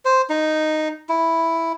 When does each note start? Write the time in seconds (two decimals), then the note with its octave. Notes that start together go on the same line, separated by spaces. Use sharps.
0.05 C5
0.30 D#4
1.09 E4